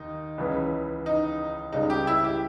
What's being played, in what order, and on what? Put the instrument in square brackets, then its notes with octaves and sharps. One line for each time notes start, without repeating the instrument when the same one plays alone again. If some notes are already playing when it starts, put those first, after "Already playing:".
Already playing: [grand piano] D#2 D#3 [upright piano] D#4
[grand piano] C#2 C#3 E3
[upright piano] D#4
[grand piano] C#2 C#3 G3 [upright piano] D#4
[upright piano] G4
E4
G4